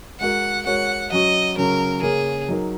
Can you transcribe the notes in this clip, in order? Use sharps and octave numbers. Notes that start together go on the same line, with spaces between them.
G#3 F#4 A#4 F#5
G#3 F#4 A#4 C#5 F#5
F#3 C#4 F#4 D#5
C#3 F#3 C#4 A#4
C#3 A#3 C#4 G#4 A#4 C#5
F#3 D#4 A#4